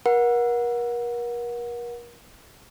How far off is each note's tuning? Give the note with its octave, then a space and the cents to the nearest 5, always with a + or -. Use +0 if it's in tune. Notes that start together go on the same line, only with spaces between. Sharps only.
A#4 +40 F#5 -20